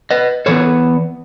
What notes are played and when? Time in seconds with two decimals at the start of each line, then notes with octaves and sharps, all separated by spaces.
0.11 B4 D#5
0.46 E3 B3 A4 C#5